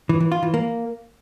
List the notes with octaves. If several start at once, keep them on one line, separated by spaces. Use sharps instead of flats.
E3
E3
F4
E3
A#3